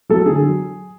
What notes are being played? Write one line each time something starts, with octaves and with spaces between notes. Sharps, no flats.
F#3 A3 A4
D3 G#4
F#3